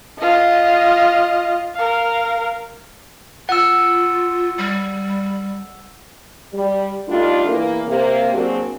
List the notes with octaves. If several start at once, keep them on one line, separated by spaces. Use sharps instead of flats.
F4 D#5
A#4 F5
F4 F#5 E6
G3
G3
G3 A3 D4 D#4 F4
E2 E3 A#3
C3 A#3
F#3 A#3 C4 D4 F#4 G#4